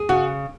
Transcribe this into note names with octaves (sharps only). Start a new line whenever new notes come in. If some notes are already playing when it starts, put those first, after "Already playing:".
Already playing: G#4
C#3 F#4